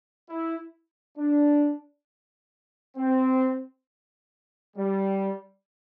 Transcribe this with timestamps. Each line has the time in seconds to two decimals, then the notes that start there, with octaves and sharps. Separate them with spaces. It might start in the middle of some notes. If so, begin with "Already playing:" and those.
0.29 E4
1.18 D4
2.97 C4
4.77 G3